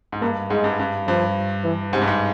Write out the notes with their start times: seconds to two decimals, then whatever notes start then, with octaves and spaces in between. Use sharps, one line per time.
0.12 G#2
0.21 G2 A#3
0.50 G#2 G#3
0.64 G2
0.79 G2
1.07 G2 F3
1.64 E3
1.93 G#2 C3
2.02 G2
2.08 G#2